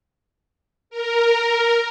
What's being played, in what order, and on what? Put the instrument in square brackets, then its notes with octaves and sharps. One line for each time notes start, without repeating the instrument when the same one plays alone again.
[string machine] A#4